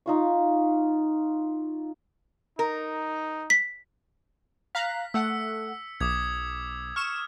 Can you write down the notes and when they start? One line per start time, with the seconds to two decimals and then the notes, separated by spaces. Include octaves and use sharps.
0.06 D#4 F4 C#6
2.59 D#4 A#4
3.50 B6
4.75 F5 A#5 F#6 B6
5.14 A3 F#5 E6 C#7
6.00 B1 D6 D#6 G#6
6.96 C#6 F6 E7